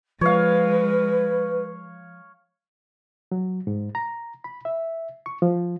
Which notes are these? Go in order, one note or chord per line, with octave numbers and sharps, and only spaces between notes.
F3 G#3 B4 C#5 F5
F#3
G#2
A#5
B5
E5
C#6
F3